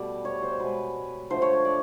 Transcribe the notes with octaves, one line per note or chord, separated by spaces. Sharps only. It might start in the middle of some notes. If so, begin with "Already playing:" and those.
Already playing: B2 G3 A3 D5
C#5
C5
B2 G#3 B4
D3 F3 A3 C5
C#5
C#5
D5